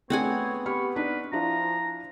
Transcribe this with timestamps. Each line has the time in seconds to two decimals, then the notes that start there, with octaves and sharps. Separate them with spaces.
0.10 A3 B3 C4 D4 G#4 C#5 F#5 G#5
0.66 G4 B5 C#6 F6
0.96 D4 D#4 B4
1.33 F3 D4 E4 F4 A#5